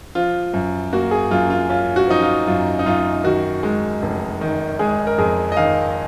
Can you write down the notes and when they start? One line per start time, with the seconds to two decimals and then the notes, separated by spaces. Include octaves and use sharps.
0.15 F3 F4
0.53 F#2
0.93 A#3 F#4
1.11 G#4
1.31 F#2 F4
1.50 F4
1.70 C#4 F4
1.96 F#4
2.08 F3 D#4
2.22 F4
2.47 F#2 F4
2.79 D#4
2.86 F#2 F4
3.24 D#3 F#4
3.63 G#3
4.02 F1
4.41 D#3
4.79 G#3 G#4
5.07 A#4
5.18 F2 G#4
5.52 D#5
5.57 D#3 F5